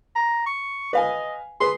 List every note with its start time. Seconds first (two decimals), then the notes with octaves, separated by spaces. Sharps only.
0.15 A#5
0.46 C#6
0.93 B4 D#5 F5 G#5
1.60 G#4 B4 C6